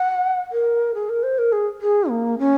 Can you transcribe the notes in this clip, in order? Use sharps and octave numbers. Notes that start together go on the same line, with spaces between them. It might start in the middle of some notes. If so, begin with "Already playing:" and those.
Already playing: F#5
A#4
G#4
A#4
C5
A#4
G#4
G#4
A#3
C#4